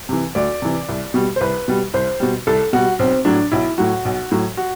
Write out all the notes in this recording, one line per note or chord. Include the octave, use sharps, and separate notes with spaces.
C3 E3
D2 D5
C3 E3
C2
B2 G3
C5
C2 B4
B2 G3
C2 C5
B2 G3
C2 A4
B2 G3 F#4
B1 C4
A2 F#3 D4
B1 E4
A2 F#3 F#4
B1
A2 F#3
F#4